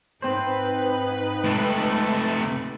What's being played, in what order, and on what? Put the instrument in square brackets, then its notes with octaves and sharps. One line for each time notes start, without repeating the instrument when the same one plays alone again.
[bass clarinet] G#2 [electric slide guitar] C4 C5 [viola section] D#4 B4
[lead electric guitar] C3 A3 [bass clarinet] G#3